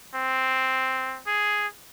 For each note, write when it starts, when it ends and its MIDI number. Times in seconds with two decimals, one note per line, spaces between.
0.15 1.19 60
1.27 1.67 68